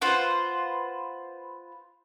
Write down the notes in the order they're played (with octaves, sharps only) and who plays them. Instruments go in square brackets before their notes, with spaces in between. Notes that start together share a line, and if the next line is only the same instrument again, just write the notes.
[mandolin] F4 B4 C5 F#5